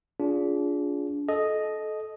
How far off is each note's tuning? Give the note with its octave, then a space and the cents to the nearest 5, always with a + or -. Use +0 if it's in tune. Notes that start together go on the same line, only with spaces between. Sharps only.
D4 -30 F4 +5 G#4 +0
A4 -25 D#5 +0